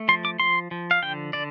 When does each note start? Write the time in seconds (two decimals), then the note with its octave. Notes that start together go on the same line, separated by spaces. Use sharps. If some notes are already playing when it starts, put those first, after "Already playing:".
Already playing: A3
0.08 F3 C6
0.25 D6
0.40 F3 C6
0.71 F3
0.91 F5
1.02 D3 G5
1.33 D3 D5